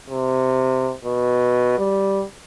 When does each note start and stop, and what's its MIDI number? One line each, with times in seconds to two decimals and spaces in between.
0.10 0.93 48
1.04 1.77 47
1.78 2.23 55